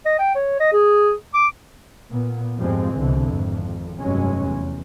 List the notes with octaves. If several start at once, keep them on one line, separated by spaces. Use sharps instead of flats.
D#5
G5
C#5
D#5
G#4
D6
A#2 B3
F2 G#2 F3 G3 G#3 C4
C2 B2 D3 E3
G#1 F2
F1 G2 F#3 G#3 C#4
E2